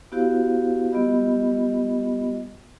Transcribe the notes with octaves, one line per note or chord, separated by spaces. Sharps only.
B3 E4 F#4 G4 C5 F5
G3 B3 F4 G4 D#5 B5